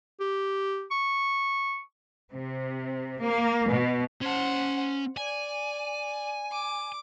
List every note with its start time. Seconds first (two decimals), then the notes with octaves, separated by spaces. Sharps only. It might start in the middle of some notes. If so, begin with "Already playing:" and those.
0.20 G4
0.91 C#6
2.32 C3
3.22 A#3
3.69 B2
4.21 C#4 C5 F#5 A5
5.17 D5 G#5
6.52 D6